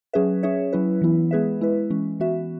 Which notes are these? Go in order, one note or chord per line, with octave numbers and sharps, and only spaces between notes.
F#3 C#4 G#4 B4 E5
C#4 G#4 C#5 E5
F#3 C#4 E4 B4
E3 B3 E4
G#3 B3 G#4 B4 E5
G#3 E4 B4
E3 G#3 C#4
E3 B3 F#4 E5